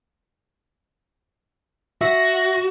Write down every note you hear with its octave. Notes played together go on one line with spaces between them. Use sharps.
F#4 E5 A#6